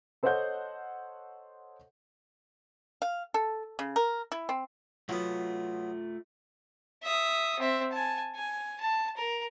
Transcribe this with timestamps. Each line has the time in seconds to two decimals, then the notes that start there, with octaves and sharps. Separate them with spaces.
0.23 A4 C5 C#5 D#5 F#5 G6
3.02 F5
3.34 A4
3.79 C#3
3.96 A#4
4.32 E4
4.49 C4
5.09 F#3 A3 B3 F4 A5
7.03 E5 D#6
7.59 C4 E5
7.92 G#5 A5
8.35 G#5
8.80 A5
9.17 A#4